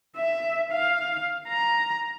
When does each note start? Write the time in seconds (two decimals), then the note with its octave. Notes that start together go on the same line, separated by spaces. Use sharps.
0.16 E5
0.72 F5
1.48 A#5